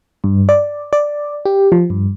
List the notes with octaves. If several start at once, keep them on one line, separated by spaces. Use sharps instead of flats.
G2
D5
D5
G4
F3
G2